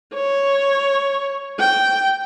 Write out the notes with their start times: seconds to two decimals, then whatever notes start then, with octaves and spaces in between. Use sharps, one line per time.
0.14 C#5
1.60 G5